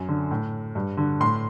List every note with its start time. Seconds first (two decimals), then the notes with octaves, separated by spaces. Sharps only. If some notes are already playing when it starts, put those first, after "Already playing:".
Already playing: F#2
0.08 D3
0.31 A2
0.75 G2
0.97 D3
1.20 A2 C6